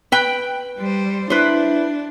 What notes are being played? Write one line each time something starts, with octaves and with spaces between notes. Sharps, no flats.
B4 G5
G3 C5
D4 E4 B4 C5